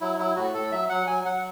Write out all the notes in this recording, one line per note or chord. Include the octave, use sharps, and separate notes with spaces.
F#3 E4
F#3 E4
A2 F#4
A2 A4
F#3 E5
F#3 F#5
F#3 G#5
F#3 F#5